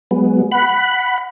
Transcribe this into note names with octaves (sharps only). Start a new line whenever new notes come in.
F#3 G#3 B3
F#5 B5